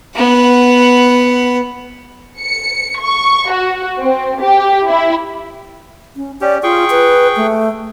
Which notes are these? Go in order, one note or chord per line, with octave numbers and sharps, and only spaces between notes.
B3 F#5
C#7
C#6
F#4
C4
G4
E4
C#4
C#4 G4 D5
F4 G#4 G5 C#6
B4
A3